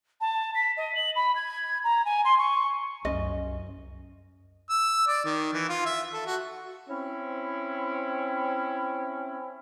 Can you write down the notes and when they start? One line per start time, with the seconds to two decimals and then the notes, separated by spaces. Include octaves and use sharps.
0.21 A5
0.55 B6
0.77 D#5
0.95 F#7
1.16 B5
1.35 G#6
1.84 A#5
2.05 G#5
2.25 C6
2.39 C#6
3.05 C2 F#2 C#4 D#5
4.70 E6
5.07 D5
5.25 D#3
5.54 E3
5.69 F4
5.86 E5
6.13 A4
6.26 F#4
6.89 C4 C#4 E4